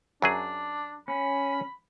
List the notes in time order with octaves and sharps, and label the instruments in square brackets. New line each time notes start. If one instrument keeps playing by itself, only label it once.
[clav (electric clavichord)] F#2 F#3 G#4 [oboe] D4
[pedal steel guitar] C#4 [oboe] B5